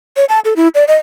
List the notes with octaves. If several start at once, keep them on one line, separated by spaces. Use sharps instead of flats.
C#5
A5
A4
E4
D5
D#5